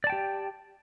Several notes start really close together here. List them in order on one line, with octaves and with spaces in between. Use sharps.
D5 A5 G5 G4